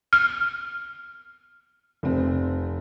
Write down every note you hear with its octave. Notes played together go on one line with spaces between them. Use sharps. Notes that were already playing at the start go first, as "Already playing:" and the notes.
F6
F1 C4